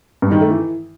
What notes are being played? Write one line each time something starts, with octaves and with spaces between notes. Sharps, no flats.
G2
D#3
A3
E3